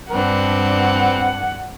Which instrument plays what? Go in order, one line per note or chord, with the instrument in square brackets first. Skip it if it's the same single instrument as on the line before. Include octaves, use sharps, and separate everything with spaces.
[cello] G2 D4 [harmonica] C4 B4 [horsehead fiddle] F#5